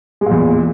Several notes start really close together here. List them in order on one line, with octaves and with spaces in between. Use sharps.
G#3 A#2 E2